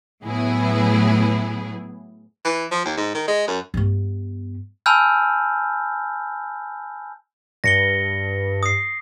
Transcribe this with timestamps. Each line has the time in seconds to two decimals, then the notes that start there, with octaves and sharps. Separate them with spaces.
0.24 A2 F#3 B3 E4 G#4
2.45 E3
2.72 F3
2.86 D#2
2.98 G#2
3.15 D#3
3.28 G#3
3.48 F#2
3.74 G2 B3
4.86 G#5 A5 B5 E6 F6 G6
7.64 G2 A#6 C#7 G7
8.63 D#6 C7